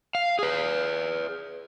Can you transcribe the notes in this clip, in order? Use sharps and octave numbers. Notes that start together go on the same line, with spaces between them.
F5
G#4 B4